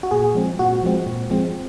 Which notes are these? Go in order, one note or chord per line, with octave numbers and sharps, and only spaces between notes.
F#4
A#2 G#4
F3 G#3 C4
A#2 F#4
F3 G#3 C4
A#2
F3 G#3 C4